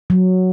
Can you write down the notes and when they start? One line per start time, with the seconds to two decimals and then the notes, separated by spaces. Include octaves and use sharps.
0.10 F#3